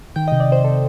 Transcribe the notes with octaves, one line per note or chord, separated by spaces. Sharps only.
D#3 G5
C3 D#5
D5
C3 C5
C3 A4